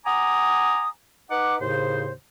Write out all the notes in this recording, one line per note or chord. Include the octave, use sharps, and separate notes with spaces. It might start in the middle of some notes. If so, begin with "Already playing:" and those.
F#5 G#5 A#5 D6 D#6
D#4 B4 F#5 D6
D#2 A2 C#3 C5